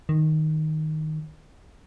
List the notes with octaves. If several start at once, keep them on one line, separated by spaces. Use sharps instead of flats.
D#3